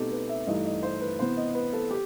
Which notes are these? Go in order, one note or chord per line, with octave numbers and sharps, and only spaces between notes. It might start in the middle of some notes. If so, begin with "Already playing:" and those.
Already playing: B2 A3 C4 D#4 G4 A4
B4
E5
G2 E3 A3 D#4 D#5
D#5
C5
B4
C3 E3 B3 C5
D#5
B4
A4
G4